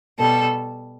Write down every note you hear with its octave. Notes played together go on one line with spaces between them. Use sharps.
B2 G3 A4